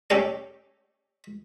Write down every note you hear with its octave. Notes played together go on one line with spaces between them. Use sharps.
C#4 G4 A4 D5